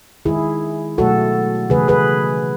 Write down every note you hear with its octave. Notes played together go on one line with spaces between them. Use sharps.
D#3 G#3 E4 G#4
B2 F#3 A3 F#4 A4
C#3 E3 A3 G#4 B4
G#4 B4